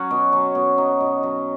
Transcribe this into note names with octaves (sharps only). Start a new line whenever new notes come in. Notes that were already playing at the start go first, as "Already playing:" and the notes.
Already playing: F#3 C#4 F#4 F#5
B2
F#3 C#4
B2
F#3 D#4
B2
F#3